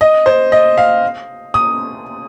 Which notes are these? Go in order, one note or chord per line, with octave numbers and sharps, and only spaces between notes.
D#5
C5
D#5
F5
D#6